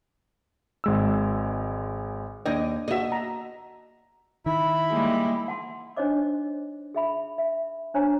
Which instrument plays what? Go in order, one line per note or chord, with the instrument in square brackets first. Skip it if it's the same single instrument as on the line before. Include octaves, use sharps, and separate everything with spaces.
[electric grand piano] G#1 G#3 E6
[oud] D#2 D#5 [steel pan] D4 G5
[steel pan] A#3 F#4 [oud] D#5 E5
[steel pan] A5 A#5
[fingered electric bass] D#3 [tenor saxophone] E4 [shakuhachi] B5
[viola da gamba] G3 G#3 A#3
[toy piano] F#5 A5 C6
D4 D#4 C5 C#5 D#5 D6
G#4 E5 B5
E5
D4 C5 C#5 G#5 A#5